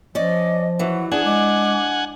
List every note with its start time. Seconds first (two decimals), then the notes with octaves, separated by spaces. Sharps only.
0.15 F3 C#4 D5 D#5
0.79 E3 F#3 F#4
1.12 D4 G#4 F#5 G#5
1.25 G#3 D6